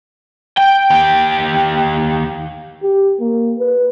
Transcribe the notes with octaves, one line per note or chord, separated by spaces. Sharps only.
G5
D#2 G4
G4
A#3
B4